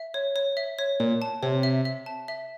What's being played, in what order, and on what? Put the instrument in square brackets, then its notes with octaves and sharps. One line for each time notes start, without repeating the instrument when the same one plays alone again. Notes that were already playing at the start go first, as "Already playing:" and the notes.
Already playing: [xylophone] E5
C#5
C#5
E5
C#5
[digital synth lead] A#2 [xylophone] C#5
[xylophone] A5
[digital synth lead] C3 [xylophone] C#5
[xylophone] E5
E5
A5
E5